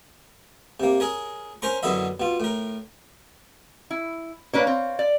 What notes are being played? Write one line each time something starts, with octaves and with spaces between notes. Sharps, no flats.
C3 A#3
G#4 A#4 C#5
C#4 A#4 C5 A#5 C#6
F#2 B2 D3 E4 D#5 E5
B2 F4
A2 A#4
E4
A#3 D4 B4 C#5 F5
C4
D5